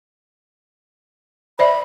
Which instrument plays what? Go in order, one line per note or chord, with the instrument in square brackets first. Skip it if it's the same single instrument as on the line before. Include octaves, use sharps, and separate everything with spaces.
[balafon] C5 D5 E5 [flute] B5